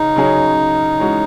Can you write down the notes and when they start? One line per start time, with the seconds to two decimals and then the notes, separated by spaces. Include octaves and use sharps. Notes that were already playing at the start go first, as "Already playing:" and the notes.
Already playing: C#3 C#4 D#4
0.16 C#3 F#3 C#4 G#4
0.98 E3 G#3 C#4 F#4